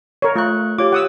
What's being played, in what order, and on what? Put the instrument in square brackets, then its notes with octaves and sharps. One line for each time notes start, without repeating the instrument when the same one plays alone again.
[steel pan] A#4 C#5
[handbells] A3 C#6 F#6 [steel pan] F4
[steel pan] F4 [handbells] G4 C#5 D6
[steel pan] F#5 D#6 E6